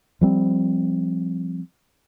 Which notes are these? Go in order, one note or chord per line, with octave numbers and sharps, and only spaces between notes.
F3 G3 C4